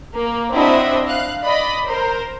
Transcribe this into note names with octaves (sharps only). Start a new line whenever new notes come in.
A#3
C4 D4 E4 F#4 D#5 E5
F5 F#6
D5 D#5 B5
A#4 C5